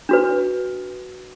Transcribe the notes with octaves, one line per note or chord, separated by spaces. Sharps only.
D4 F#4 B4